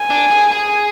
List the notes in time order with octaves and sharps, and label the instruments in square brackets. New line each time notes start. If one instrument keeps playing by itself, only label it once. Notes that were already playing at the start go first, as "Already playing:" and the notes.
Already playing: [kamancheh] G#5
[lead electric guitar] D4
G#4
G#4